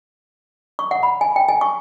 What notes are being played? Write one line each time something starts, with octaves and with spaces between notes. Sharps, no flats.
C#6
F#5
B5
G#5
G5
G#5
C#6